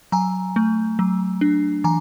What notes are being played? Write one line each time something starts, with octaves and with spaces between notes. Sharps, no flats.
F#3 G#5 A#5
A3
F#3
D4
E3 G#5 A#5